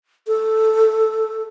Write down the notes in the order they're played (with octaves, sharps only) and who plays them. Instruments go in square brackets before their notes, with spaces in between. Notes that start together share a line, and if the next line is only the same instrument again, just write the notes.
[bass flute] A4